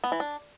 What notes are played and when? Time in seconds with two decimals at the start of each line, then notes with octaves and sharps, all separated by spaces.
0.04 B3
0.12 E3
0.20 D4